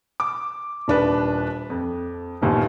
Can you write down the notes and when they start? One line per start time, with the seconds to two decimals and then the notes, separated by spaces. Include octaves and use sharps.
0.20 D6
0.88 D#1 D4 B4
1.70 F2
2.42 G1 D#2 A#2